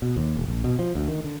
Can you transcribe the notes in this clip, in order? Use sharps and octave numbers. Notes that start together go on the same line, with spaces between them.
B2
D#2
E1
A#1
B2
F3
D2
D#3
D3